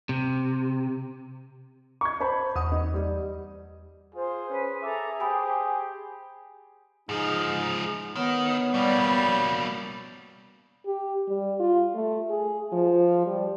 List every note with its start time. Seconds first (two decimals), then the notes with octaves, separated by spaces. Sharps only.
0.09 C3
2.01 C#6 G#6
2.20 C5 A5 B5
2.56 E2 F#5 D#6
2.72 D#4
2.94 G3
4.15 F4 G#4 C5
4.49 C#4 B4 C5 G#5
4.82 A4 E5 A#5 D6
5.20 G4 C5 G#5 B5 D#6
7.09 G#2 F3 D#4 G#4
8.16 D#3 B3 C#5
8.74 B2 G3 A#3
10.86 G4
11.28 G3
11.59 F4
11.94 A3
12.29 G#4
12.72 F3
13.26 G3